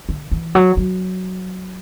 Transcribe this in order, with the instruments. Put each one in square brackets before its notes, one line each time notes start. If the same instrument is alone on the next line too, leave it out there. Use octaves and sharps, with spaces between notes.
[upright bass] D3
E3
F#3
F#3